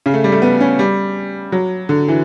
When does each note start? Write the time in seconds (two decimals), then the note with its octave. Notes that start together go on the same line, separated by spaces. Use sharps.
0.06 C#3
0.14 A3
0.24 G3
0.32 A3
0.42 B3
0.61 C#4
0.79 G3
1.52 F#3
1.89 D3
2.08 E3